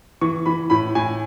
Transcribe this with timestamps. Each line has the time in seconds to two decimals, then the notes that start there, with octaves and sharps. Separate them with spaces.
0.21 E3 C#6
0.46 E3 B5
0.70 A2 B5
0.95 A2 G#5